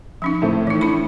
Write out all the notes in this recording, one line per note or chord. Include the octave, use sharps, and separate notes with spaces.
F3 C#4 D#4
A2 A3 C4
E3 D#4
D4 E4 B5